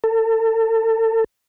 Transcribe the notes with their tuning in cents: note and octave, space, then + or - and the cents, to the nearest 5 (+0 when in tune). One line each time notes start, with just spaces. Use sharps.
A4 +35